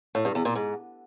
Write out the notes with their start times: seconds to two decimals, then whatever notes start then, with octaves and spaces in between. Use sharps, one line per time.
0.15 A2
0.25 G2
0.35 E2
0.45 A#2
0.55 G#2